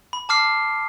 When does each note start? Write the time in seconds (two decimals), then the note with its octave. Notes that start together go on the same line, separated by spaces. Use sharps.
0.13 B5
0.29 A5 D6 F6 C7